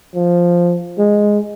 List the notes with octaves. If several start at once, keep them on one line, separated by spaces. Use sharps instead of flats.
F3
G#3